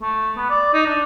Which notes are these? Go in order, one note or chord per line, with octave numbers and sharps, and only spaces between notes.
A3
B3
D5
D#4
D4